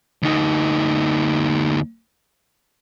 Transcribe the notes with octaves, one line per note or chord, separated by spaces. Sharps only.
D2 D#4